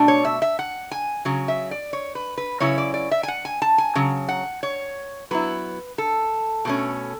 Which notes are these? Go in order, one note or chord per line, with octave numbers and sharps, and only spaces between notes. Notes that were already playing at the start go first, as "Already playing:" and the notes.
Already playing: B2 A3 D4
C#5
E5
E5
F#5
G#5
C#3 F#3
E5
D5
C#5
B4
B4
C#3 F#3 C#4 E4 C#5
D5
D5
E5
G#5
F#5
G#5
A5
G#5
C#3 F#3
F#5
C#5
F#3 B3 E4 B4
A4
B2 A3 C#4